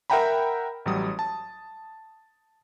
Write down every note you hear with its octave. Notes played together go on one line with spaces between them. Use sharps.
A#4 E5 F#5 G5 A#5 B5
A1 F#3 G3 D#6
A5